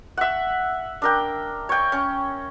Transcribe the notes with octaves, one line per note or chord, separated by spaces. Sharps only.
E5 F#5
D4 A#4 G5
C#5 G5
C#4